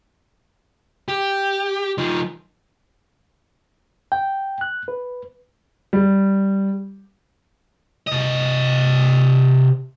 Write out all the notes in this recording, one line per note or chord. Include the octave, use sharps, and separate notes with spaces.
G4
F3 D#4
G5
F#6
B4
G3
C3 D#5